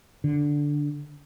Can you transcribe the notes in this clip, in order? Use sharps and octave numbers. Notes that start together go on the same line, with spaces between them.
D3